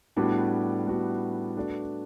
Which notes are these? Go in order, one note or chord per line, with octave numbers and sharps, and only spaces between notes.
A2 G3 B3 D4 F#4
A2 G3 B3 D4 F#4
A3 D4 F#4 B4 D5